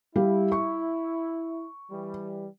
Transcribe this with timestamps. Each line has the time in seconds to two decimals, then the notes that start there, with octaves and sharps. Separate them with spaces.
0.16 G3 E4 G4 F5
0.52 C#6
1.91 E3 G3